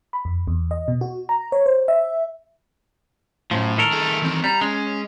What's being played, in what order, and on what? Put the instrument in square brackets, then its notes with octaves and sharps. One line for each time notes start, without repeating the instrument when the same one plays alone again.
[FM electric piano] B5
F2
E2
D#5
B2
F#4
A#5
C#5
C5
E5
[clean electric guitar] F#2 F3 [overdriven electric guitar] A2
[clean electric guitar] D#3 A4 A#4
[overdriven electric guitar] A3 G#4
E3 C4
[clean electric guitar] G3 [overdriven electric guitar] A#5
[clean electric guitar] G#3 [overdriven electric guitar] C#4